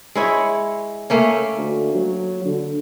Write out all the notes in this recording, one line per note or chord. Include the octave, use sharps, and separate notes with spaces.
G#3 E4 C#5
A3 A#3 C#4
D2
F#3
D3